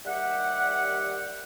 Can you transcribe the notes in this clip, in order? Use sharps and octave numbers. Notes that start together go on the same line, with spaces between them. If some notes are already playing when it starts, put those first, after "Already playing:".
D#2 G3 G4 E5 F#5